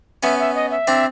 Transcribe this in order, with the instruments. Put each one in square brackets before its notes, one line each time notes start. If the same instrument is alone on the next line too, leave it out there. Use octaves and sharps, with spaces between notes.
[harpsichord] B3 C#4 [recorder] E5
[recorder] E5
D#5
E5
[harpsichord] C4 D4